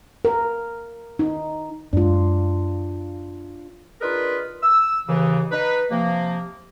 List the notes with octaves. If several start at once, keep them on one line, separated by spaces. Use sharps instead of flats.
A#4
D#4
F#2 G#3 D4 F4
D4 D#4 F4 G#4 A#4 B4
E6
D#2 C#3 E3
D#4 B4
C3 F3 A#3